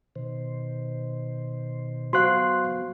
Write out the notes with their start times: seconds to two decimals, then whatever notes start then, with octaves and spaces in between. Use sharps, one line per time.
0.16 B2 D#3 C5
2.13 F#3 B3 F#4 C5 F5 C6 F#6